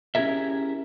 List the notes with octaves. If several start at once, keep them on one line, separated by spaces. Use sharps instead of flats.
C#4 E4 G4 G#4 A#4 E5